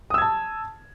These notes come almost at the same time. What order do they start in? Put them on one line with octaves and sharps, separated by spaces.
D#6 E6 G#6 A5